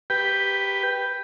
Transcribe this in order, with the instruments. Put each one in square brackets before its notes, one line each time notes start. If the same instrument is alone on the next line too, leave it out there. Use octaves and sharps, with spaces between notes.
[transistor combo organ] G4 B4 G5